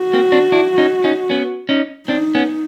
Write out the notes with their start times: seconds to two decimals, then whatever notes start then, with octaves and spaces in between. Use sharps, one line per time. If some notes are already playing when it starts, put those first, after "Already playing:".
Already playing: F#4
0.13 A#3 C4
0.32 C4 D4
0.52 D4 E4
0.78 C#4 D#4
1.04 C#4 D#4
1.30 B3 C#4
1.69 C#4 D#4
2.08 C4 D4 D#4
2.35 B3 C#4